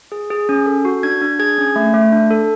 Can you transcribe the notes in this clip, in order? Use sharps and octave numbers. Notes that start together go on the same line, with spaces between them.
G#4
G#4
C#4
A4
F#4
D4 G#6
D4
G#4 G#6
C#4
A3
A3
D4
A4